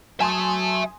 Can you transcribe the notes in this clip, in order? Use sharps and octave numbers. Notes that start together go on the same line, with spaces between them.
F#3 E5 G#5 A5 C6 D#6